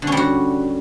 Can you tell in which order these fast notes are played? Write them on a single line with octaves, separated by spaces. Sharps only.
D3 C#4 G3 F#4